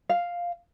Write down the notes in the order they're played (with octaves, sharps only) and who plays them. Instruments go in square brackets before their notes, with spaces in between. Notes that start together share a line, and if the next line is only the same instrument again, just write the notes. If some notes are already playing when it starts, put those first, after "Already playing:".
[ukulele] F5